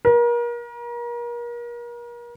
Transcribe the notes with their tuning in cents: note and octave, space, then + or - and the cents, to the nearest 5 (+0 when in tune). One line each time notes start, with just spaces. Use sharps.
A#4 +35